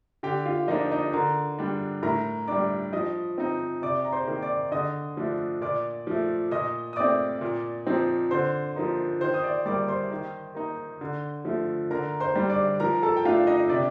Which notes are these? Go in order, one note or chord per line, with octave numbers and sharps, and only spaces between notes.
D3 G4 G5
F4 F5
F3 A#3 D4 D#4 D#5
D#4 D#5
D3 A#4 A#5
G3 D4
A2 A#4 A#5
G3 D4 D5 D6
F3 D#5 D#6
C4 D#4
C3 D5 D6
A#5
C5 C6
D#3 A#3
D5 D6
D3 D#5 D#6
F3 A3 D4
A#2 D5 D6
F3 A3
A#2 D#5 D#6
D#6
A3 C4 D5 D6
A#2
F3 C4 D#4
D3 C5 C6
F3 A#3 D#4
D#3 C5 C6
D#6
D5 D6
G3 A#3 D5 D6
C5 C6
D#3
A#3 D#4
D3
F3 A3
D3 A#4 A#5
C5 C6
G3 D4
D5 D6
F3 A#4 A#5
A4 A5
G5
A3 D4 F4 F5
D#4 D#5
C3 D4 D5